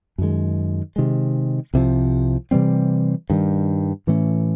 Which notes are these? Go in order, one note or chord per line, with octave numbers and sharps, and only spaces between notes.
F#2 D#3 G#3
C3 D#3 G#3
C2 C3 F3
C3 E3 G3 C4
G2 D#3 G3
A2 E3 A3 C#4